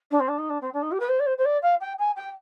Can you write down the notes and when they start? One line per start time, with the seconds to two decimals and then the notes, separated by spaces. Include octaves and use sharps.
0.11 D4
0.20 C4
0.28 D4
0.38 D#4
0.50 D4
0.61 C4
0.73 D4
0.82 D#4
0.92 G4
1.00 B4
1.09 C5
1.20 D5
1.26 C5
1.38 C5
1.45 D5
1.62 F5
1.80 G5
1.99 G#5
2.16 G5